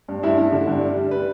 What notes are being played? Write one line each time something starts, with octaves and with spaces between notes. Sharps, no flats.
G2
G2 E4 E5
G2
D3
G2
G3
G3
G3 B4